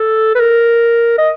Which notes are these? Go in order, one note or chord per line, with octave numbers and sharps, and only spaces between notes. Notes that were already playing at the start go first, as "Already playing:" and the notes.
Already playing: A4
B4
A#4
D#5